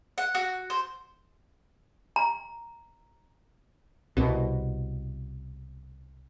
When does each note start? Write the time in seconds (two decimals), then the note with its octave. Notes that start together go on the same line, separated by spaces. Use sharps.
0.18 F#5
0.35 F#4
0.70 C5
2.16 A#5
4.17 C2 B2